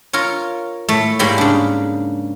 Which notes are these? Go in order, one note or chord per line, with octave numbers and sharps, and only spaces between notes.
F4 A#4 C#5
A2 A3
G#2 G3 A#3 C#5 B5 C6
C#3 D4